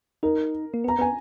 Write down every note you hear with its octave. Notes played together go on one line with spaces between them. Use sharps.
D#4 A#4
A#3
B3 A#5
B3 G#5